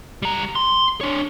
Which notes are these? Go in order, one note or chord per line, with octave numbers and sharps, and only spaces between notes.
G3 A#5
C6
D4 C#5